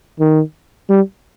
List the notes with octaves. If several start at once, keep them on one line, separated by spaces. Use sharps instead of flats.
D#3
G3